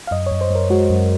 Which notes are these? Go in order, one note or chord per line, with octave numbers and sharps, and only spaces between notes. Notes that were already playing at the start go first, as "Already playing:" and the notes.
F5
F#2 D#5
F#2 C#5
C5
F#2 A#4
G#3 F#4
F#2